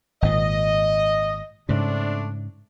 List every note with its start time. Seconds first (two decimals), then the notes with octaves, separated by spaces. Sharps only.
0.22 G#1 A#2 D#5
1.69 G#2 C#3 A3 C4 D4